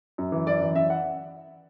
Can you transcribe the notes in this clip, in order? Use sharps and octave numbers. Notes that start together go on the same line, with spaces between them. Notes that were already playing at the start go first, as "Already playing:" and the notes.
F#2
E3
F#2 D5
E3
F#2 E5
F#5